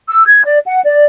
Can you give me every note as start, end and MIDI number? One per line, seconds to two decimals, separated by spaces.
0.08 0.25 88
0.27 0.44 92
0.45 0.59 74
0.66 0.81 78
0.86 1.05 74